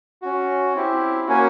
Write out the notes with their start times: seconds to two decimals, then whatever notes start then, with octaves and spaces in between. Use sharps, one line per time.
0.22 C#4 F#4
0.75 C4 E4 G4
1.26 A#3 C#4 F#4 G#5